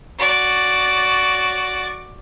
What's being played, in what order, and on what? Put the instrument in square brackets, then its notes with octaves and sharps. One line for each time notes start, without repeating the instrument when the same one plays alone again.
[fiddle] F#4 D5